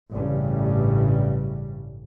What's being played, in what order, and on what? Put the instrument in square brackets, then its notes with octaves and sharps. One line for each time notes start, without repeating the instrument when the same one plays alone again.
[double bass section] A1 G2 C#3 G3